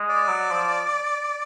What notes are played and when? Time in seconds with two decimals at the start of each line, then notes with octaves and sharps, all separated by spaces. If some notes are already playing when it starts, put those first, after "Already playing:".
Already playing: G#3
0.10 D5
0.27 F#3
0.52 F3